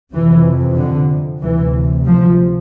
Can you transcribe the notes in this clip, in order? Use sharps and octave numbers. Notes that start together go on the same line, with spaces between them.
F2 C3 E3
D3
D2 C3 E3
F3